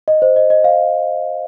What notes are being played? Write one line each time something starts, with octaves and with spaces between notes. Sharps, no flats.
D#5
C5
D#5
D#5
F5